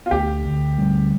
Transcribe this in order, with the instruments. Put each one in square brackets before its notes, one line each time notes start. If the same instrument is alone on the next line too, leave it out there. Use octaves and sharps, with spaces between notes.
[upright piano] F4
[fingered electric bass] D2 [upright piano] G4
[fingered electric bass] D2
G3